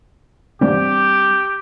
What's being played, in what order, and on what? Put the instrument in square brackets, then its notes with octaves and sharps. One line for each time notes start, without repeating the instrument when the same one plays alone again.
[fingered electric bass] G3 C4 D4 [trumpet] G4